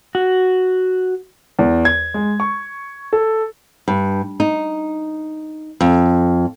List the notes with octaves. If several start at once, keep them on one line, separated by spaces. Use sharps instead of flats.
F#4
E2
G#6
G#3
C#6
A4
G2
D#4
F2